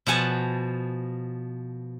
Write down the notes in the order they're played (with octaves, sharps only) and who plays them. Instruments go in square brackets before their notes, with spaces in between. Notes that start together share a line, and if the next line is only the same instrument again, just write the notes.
[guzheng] B2 F3 F#5 G#5 A5